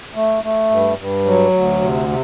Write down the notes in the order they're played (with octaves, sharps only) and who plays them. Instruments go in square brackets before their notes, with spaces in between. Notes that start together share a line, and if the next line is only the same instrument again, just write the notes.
[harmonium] A3
A3
G2
G2
F#3
D2
C3
C3